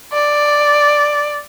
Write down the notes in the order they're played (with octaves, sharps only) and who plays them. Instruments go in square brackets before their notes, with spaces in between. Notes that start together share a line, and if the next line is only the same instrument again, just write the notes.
[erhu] D5